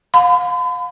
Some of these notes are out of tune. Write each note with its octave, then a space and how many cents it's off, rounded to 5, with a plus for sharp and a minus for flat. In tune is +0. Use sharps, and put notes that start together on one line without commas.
F5 +35 B5 +45